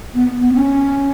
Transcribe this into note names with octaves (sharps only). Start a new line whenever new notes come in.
B3
B3
C#4